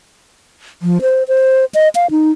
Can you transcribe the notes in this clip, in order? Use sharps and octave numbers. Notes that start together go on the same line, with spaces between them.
F3
C5
C5
D#5
F5
D#4